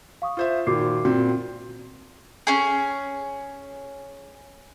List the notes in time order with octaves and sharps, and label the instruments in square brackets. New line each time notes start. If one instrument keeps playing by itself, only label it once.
[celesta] F5 C#6 D#6
[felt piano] F4 C5 E5
[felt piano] A#2 D#3 [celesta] F#4 D6 C7
[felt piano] A#2 C4 [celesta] F#4
[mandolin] C#4 G#4